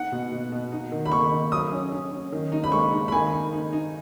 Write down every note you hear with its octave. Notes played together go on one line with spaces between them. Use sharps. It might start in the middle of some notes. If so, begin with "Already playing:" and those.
Already playing: D#4 F#5
B2
B2
B2
D#4
D#3
B5
D#3 C#6
D#3
F#3 D#6
C#4
C#4
C#4
D#3
D#4
B5
G#3 C#6
D#4
B5
D#3 G#5
D#4
D#4
D#4